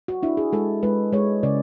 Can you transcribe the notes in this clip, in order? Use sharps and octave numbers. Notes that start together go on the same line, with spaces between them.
F#4
D4 E4
G#4
G#3 A4
G#3 B4
G#3 C#5
C#3 D5